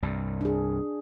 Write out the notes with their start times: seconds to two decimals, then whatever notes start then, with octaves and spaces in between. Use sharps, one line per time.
0.03 C2 G2
0.41 D4 G#4